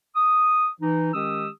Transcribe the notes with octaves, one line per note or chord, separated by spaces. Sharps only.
D#6
E3 D#4
D#3 G#3 C#4 G4 D#6 E6